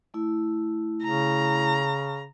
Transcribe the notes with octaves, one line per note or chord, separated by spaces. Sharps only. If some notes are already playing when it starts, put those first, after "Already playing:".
A3 E4
C#3 A#5